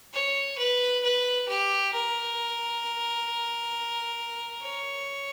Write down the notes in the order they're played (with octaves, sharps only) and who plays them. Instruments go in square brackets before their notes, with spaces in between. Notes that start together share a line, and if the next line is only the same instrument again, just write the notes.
[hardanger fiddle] C#5
B4
B4
G4
A#4
C#5